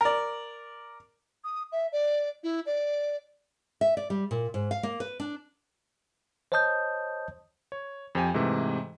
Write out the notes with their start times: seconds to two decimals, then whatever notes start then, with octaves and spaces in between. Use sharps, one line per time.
0.01 A#4 D5
1.44 D#6
1.72 E5
1.92 D5
2.43 E4
2.66 D5
3.81 E5
3.97 D5
4.10 G3
4.31 A#2
4.54 G#2
4.71 F5
4.83 A#3
5.00 B4
5.20 D4
6.52 C5 C#5 D#5 A5 D#6 G6
7.72 C#5
8.15 F2 F3 G4 G#5
8.34 G#2 C3 E3 A3